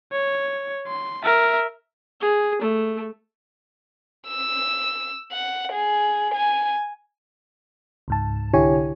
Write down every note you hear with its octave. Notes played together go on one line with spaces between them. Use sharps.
C#5
C6
A#4 E5
G#4
A3
E6
F#5
G#4
G#5
C#2 G#2 A5
C2 D3 E4 G4 C#5 G#5